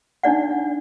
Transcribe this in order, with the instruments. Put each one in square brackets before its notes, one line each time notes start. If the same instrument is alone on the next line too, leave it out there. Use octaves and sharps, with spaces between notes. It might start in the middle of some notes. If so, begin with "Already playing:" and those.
[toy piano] D4 D#4 D5 F#5